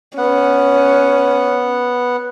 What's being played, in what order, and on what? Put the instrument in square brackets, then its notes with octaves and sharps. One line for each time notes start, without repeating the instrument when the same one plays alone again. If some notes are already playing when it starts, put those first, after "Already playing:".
[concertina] B3 F#5 [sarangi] C#4